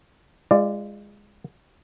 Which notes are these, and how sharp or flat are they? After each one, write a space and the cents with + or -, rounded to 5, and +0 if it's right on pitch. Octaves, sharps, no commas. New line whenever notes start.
G#3 -15 F4 -30 D5 +15